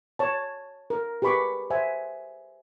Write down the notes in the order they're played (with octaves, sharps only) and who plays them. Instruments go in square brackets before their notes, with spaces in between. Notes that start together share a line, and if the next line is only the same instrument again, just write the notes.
[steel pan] C#5 A5
A#4
G4 G#4 B4 B5 C#6 D6
C5 E5 F#5 G#5